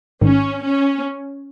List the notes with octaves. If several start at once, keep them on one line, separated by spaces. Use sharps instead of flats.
A1 G#2 D#3 C#4
C#4